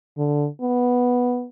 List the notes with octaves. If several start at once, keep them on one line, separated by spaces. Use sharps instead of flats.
D3
B3